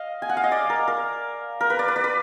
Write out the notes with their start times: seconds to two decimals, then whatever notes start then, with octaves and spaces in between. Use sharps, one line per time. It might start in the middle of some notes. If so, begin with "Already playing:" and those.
Already playing: D#5 F5
0.22 G#5
0.29 F#5
0.37 F5
0.44 D#5
0.52 D5
0.70 A#4
0.88 A#4
1.61 A#4
1.70 B4
1.79 D5
1.88 B4
1.96 D5
2.04 B4